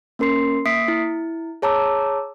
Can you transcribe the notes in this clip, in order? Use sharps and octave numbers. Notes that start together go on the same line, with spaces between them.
A#3 C#4 A#4 C6 C7
A#3 E5 D#6 B6 C7 D7
E4
G#4 C#5 A5 A#5 D6 E6